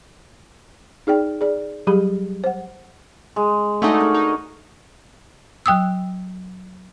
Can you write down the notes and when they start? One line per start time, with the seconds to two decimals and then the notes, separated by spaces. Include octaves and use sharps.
1.07 D#4 G#4 D5 G5
1.41 G#4 D5
1.87 F#3 G3 G4 G#4 B5
2.44 C5 F#5
3.36 G#3
3.82 D3 A3 D#4 F#4 G#4
4.00 A#4
4.14 D#4
5.66 F#3 G5 D#6 E6